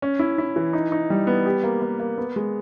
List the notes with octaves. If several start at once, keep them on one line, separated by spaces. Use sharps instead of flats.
C#4
E4
E4
E3
D#4
D#4
G3
B3
G4
A#3
A#3
A#3
B3
G#3